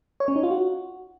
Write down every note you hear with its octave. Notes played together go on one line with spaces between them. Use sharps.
C#5
C#4
D#4
F4
F#4